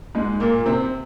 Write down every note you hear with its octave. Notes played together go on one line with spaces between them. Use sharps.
G#2 G#3
A#2 A#3
C3 C4